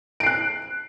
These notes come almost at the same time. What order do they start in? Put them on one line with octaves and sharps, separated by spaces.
D7 C7 F#6